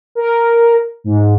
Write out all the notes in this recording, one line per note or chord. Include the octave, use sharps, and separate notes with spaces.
A#4
G#2